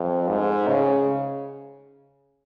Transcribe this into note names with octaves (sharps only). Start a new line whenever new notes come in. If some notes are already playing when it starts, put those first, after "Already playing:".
Already playing: F2
G#2
C#3